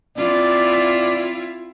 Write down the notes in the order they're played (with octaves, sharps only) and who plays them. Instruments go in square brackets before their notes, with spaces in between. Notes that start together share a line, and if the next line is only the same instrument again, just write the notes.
[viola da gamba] C4 E4 F4 [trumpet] D5